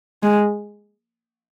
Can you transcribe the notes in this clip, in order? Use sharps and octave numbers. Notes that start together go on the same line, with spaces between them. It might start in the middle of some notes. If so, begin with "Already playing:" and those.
G#3